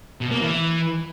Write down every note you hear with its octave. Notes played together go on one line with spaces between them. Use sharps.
B2
A#3
E3